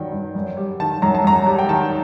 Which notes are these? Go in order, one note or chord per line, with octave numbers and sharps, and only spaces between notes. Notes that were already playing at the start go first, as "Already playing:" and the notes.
Already playing: G2 D#3 F#3 G5
G2
F#2
G3
D#3 A5
F#2 A#5
A5
F#2 A#5
G3
G5
D#3 A5